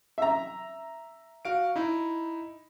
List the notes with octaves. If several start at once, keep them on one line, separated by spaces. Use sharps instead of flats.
E5 A#5
F#4 F5 D7
D#4 E4